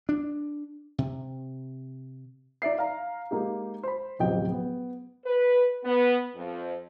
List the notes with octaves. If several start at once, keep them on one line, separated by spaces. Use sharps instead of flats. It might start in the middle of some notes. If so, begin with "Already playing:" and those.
D4
C3
D#4 D5 E5 C7
F5 A#5
G#3 A#3 D#4 G4
C5 B5
D1 A1 F2 C3 D#5 G5
B3
B4
B3
F2